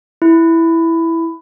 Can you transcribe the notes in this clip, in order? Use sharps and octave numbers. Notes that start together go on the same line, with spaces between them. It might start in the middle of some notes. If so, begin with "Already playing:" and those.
E4